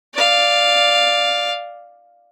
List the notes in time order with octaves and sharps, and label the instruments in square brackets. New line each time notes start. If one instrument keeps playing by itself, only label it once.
[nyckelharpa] D5 F5